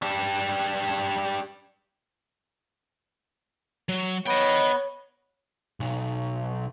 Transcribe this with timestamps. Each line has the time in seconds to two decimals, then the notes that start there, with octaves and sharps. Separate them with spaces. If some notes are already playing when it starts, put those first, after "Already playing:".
0.02 G3 D4
3.89 F#3
4.27 B3 C#5 D#5 G5
5.80 B1